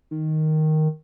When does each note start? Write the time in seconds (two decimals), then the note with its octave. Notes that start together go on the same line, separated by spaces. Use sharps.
0.11 D#3